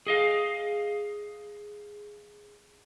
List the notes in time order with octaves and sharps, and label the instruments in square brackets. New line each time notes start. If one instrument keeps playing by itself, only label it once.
[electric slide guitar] G#4 D#5 F5